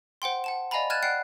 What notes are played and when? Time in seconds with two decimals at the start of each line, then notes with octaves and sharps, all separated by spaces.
0.22 C5 F#5 G5 C6
0.44 F#5 A5 E7
0.71 D5 D#5 F5 G#5 A#5 B5
0.90 F6 F#6 G#6 A6 D#7 E7
1.03 D5 F#5 G5 F#6 C7